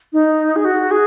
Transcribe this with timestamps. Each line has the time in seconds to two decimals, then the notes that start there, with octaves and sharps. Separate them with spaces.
0.13 D#4
0.56 G#4
0.65 F#4
0.91 G#4